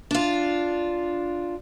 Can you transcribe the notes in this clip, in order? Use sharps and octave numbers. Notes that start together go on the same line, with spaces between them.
D4 F4